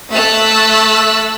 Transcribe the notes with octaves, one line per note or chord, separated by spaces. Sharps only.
A3 E6 F#6